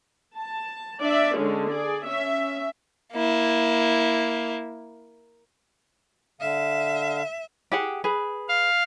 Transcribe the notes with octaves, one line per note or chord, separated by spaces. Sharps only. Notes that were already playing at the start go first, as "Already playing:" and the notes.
A5
D4 D5 E5
D3 G#3 C#4
G#4 D5
C#4 E5
A#3 E4
D3 E5 F5
G4 G#4 F#5
G#4 B4
F5